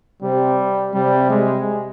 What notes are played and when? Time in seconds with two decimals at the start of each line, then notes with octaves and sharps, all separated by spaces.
0.22 C3 G3
0.94 C3 G3
1.30 G#3